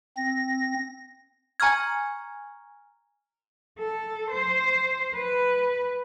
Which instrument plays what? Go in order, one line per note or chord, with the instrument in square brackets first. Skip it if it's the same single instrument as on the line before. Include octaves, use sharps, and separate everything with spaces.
[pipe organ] C4 A#6
[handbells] G#5 A#5 C#6 F6 G#6
[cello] A4
C5
B4